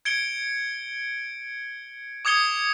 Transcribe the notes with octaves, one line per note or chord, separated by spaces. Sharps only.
G#6 C#7 D7 G7
D6 D#6 G#6 C#7 G7